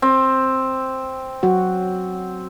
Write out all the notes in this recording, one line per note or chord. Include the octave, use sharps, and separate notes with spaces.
C4
F#3 F#4